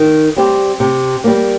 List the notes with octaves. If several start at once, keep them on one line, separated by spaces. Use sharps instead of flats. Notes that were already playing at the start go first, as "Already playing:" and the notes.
Already playing: D#3
G3 C4 G4
C3
G3 A#3